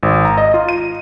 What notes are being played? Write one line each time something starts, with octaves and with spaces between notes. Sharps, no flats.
G#1
A#5
D#5
F4
D#7